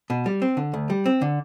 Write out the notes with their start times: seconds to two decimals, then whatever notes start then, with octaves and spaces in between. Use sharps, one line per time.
0.10 B2
0.26 G3
0.42 C4
0.57 D3
0.74 D2
0.90 G3
1.06 C4
1.22 D3